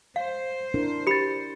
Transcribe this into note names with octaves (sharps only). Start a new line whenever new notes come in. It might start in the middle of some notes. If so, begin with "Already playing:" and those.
C5 F5
D4 E4 A#4
G4 B5 A6 C#7